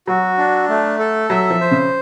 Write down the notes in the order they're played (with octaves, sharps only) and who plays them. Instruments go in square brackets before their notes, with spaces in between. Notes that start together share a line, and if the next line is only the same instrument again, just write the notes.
[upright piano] F#3 [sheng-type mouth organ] F#4
[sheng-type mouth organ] D4
A3
A4
[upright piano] F#3 [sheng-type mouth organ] E5
[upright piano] F3
[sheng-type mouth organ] C5
[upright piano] C#3